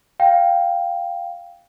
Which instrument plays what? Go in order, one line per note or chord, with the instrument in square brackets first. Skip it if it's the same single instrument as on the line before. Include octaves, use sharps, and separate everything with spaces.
[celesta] F5 G5